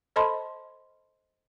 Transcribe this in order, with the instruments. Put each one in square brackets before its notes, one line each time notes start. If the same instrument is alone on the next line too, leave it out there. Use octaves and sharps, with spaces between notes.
[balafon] A4 C5 D#5 A5 B5 C6